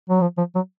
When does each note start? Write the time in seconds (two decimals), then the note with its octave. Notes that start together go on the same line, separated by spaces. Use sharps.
0.10 F#3
0.21 F3
0.38 F3
0.55 F#3